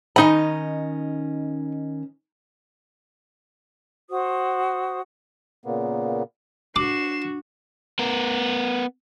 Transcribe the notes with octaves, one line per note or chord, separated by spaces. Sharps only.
D#3 C#4 D#4 D#5 B5
F#4 C5 D#6
A#2 C#3 A#3 B3
D4 F#4 D6 C7 E7
B3 A#4